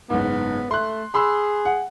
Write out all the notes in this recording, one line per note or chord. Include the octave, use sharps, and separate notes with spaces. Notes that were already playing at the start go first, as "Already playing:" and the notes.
F#1 G#2 B3
A3 C6 F#6
G#4 B5 C6 E6
F#5